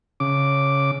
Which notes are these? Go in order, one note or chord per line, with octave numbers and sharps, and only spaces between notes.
C#3 D6